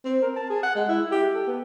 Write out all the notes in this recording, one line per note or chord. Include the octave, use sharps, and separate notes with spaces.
C4
A#4
A5
G#4
F#5
G#3
E4
G4
A4
B3